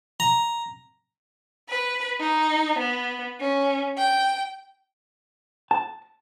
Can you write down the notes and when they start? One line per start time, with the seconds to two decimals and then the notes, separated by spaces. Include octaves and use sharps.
0.20 A#5
1.69 B4
2.20 D#4
2.79 B3
3.40 C#4
3.98 G5
5.71 A5